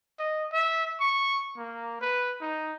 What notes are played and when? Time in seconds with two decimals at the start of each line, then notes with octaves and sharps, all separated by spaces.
0.19 D#5
0.53 E5
1.00 C#6
1.57 A#3
2.01 B4
2.41 D#4